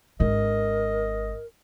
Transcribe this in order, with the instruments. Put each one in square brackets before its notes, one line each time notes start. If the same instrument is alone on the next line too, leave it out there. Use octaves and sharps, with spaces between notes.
[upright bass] G#1 D4 [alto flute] A#4 [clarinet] D#5